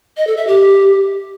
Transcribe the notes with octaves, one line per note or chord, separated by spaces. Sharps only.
D#5
A4
E5
G4